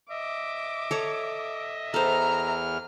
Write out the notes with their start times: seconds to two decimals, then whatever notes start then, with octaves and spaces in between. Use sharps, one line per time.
0.11 D#5 E5 D6
0.91 A4 C#5 A#5
1.94 E2 A4 C5 A#5 F6